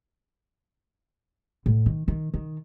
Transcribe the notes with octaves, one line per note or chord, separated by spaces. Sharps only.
A2
D#3
D#3
D#3